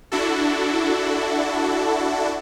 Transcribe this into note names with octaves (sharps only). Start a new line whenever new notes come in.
D4 E4 F#4 A4